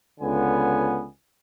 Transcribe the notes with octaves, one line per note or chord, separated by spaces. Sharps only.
C#2 D3 B3 G#5